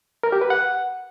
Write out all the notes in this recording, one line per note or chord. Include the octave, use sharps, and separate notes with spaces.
A#4
G4
B4
F#5